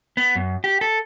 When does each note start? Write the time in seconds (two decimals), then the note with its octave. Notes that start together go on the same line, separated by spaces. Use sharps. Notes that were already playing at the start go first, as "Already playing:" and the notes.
0.17 B3
0.35 F#2
0.64 G4
0.81 A4